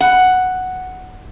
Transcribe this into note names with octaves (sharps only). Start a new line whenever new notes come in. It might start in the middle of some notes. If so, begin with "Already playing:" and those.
F#5